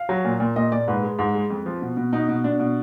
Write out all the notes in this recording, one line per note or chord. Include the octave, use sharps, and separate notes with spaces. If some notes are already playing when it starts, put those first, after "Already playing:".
Already playing: F5
F#3
A#2
A#2
A#2 D#5
A#2 D5
G#2 B4
G#3
G#2
G#3
F2
F3
B2
B2
B2 D#4
B2
B2 D4
B2